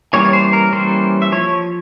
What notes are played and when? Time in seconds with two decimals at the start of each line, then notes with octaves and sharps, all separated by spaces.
0.13 E3 G3 A#3 C#4 C#5
0.33 C5
0.53 A#4
0.73 E3 G3 A#3 C#4 C5
1.22 E5
1.32 F3 C#5